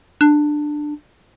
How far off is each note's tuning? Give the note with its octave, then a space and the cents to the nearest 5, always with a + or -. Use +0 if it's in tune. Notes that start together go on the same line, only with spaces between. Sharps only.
D4 +15